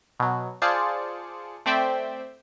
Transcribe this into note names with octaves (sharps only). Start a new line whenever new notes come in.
B2 F#3
F4 G#4 C5 D5 A5 C#7
A3 C4 C5 D5 E5 G5